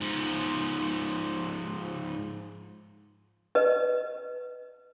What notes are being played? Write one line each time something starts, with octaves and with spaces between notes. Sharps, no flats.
G#2 F3
B4 D#5